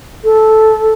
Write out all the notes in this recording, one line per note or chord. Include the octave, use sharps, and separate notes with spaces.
A4